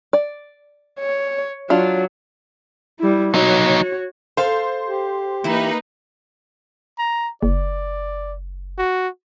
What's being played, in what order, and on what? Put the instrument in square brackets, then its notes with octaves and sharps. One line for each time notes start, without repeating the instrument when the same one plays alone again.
[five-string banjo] D5
[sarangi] C#5
[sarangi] F#3 [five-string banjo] D4 F4
[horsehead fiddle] G3 E4
[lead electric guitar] F#3 D#4 [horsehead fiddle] F#4 C#5
[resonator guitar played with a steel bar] A4 F5 [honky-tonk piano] C5
[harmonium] G4
[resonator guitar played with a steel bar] E3 E4 [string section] A#3 D#4 B4
[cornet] A#5
[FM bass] F#1 [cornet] D5
[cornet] F#4